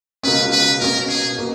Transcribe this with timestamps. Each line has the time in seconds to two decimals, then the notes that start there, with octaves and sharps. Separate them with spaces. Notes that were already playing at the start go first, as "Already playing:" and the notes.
0.23 C#2 B2 A#3 C#4 B4
0.52 B4
0.80 B2 A#3 C#4 A#4
1.09 G#4
1.38 B2 A#3